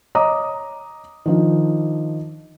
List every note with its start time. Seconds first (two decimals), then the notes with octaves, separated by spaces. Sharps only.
0.15 C#5 D#5 A#5 D6 D#6
1.26 D#3 F3 D4